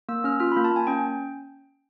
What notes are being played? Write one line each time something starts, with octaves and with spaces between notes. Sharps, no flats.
A#3 E6
C#4 F6
F4 F6
B5
A#3
A5
A#3 G#5
C#4 G5